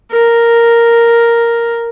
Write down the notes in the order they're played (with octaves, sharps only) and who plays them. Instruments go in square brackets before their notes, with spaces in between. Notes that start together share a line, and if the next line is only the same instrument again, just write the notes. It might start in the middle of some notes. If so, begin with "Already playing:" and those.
[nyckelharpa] A#4